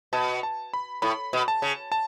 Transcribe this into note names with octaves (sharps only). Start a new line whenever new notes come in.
B2 A5
A5
B5
A2 B5
B2
A5
C#3
A5